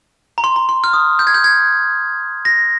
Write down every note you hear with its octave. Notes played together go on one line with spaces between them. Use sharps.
A#5
C6
A#5
C6
F6
D#6
G6
G#6
G6
G#6
A#6